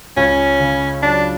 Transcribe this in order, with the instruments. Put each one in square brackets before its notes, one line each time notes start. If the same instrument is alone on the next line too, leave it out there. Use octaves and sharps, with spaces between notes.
[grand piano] C#2 [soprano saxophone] C#4
[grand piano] C#3
[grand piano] F#3 [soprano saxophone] D4